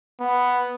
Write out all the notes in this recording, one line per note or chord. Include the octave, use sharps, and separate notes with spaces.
B3